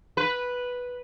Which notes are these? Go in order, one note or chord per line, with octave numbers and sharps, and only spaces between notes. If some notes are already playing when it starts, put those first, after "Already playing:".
B4